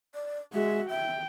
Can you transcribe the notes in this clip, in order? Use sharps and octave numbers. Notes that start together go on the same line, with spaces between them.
D5
G#3 F#4 E5
E5 G5